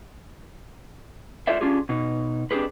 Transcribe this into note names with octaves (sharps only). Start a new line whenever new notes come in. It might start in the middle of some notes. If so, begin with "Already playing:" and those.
F4 A4 A#4 C5 D5 E5
C#4 D4 F4 G4 G#4
B2 D#4
C4 D4 E4 G4 G#4 B4